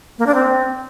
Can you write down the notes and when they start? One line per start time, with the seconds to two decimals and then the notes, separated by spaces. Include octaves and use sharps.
0.19 A#3
0.27 D4
0.35 C4